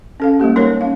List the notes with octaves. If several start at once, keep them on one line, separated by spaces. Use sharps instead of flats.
C#4 A4 F5
G3 G#3 A#3 G4
A#3 D#4 A#4 B4 C#5
C#4 F5